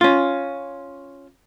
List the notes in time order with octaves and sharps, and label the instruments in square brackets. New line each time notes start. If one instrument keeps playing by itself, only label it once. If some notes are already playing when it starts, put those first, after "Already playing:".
[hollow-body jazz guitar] C#4 F4